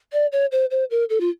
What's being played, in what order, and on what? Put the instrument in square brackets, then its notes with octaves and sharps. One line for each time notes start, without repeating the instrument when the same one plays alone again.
[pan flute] D5
C#5
C5
C5
A#4
A4
F4